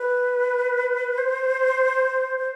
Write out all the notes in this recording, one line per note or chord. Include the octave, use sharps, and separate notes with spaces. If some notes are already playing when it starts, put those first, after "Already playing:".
Already playing: B4
C5
C5